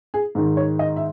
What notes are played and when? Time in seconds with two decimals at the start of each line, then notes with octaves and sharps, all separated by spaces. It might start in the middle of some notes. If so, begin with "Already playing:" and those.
0.14 G#4
0.35 G#2 D#3
0.57 C#5
0.79 D#5
0.96 E5